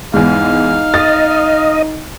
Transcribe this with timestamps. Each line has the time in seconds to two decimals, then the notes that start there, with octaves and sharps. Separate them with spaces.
0.14 E2 G#2 D#4 F5
0.94 D#5 A6